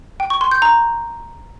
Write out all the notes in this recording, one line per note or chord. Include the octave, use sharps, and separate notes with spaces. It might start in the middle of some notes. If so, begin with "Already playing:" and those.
G5
C#6
C6
G6
A#5